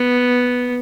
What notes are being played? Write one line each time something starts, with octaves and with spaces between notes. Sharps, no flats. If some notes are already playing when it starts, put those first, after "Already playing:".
Already playing: B3